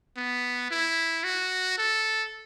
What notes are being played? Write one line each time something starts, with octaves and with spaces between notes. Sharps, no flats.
B3
E4
F#4
A4